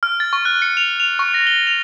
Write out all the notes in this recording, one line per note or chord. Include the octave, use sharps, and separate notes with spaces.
F6
A6
C#6
F#6
C#7
F7
F7
C#6
A#6
G7
F7